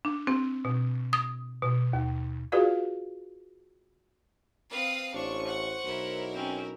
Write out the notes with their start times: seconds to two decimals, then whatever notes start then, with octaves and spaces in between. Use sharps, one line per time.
0.05 D4
0.27 C4
0.65 B2
1.13 D#6
1.63 B2
1.93 D#2
2.52 F4 F#4 G#4 B4 D5 F5
4.71 C4 B4 F5 D#6
5.14 A1 D4 C5 C#6
5.46 F#5
5.85 B1 E4 A#4
6.33 C4 C#4